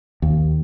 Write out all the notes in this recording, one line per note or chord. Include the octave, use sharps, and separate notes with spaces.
D#2